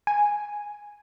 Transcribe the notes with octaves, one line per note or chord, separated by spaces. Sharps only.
G#5